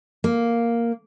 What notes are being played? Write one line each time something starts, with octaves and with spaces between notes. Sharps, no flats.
A#3